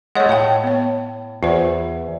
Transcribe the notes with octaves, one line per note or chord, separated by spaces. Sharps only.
G#3 A3 C#5 D#5 F#5
A2 C#5 F5 G5
B3 C#5
E2 F4 C5